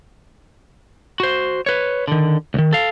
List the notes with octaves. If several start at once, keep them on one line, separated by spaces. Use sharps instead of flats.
F#4 C5
B4 C#5
D3 D#3
C#2 D#3
A4 F5